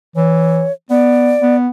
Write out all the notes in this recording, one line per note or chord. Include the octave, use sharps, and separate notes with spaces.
E3 C#5
B3 D5
B3